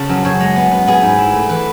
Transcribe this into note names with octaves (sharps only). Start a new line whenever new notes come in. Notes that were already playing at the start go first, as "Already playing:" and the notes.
Already playing: C#3 A5
F#2
F#2 C#5
G#3
B3
B3
B3 G#4
G#2
E4
A3
E3 B4